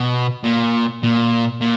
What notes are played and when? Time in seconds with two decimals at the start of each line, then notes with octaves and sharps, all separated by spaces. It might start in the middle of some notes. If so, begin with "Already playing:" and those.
Already playing: B2
0.44 A#2
1.03 A#2
1.61 A#2